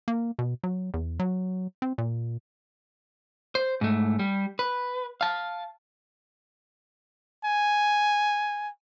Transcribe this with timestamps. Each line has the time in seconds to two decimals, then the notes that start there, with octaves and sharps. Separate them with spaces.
0.08 A#3
0.39 B2
0.64 F#3
0.94 E2
1.19 F#3
1.82 C4
1.98 A#2
3.55 C5
3.81 G#2 A3
4.19 G3
4.59 B4
5.21 F5 A5
7.45 G#5